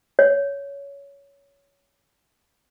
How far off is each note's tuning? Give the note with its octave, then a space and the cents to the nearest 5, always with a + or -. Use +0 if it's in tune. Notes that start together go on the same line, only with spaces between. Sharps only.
C#5 +15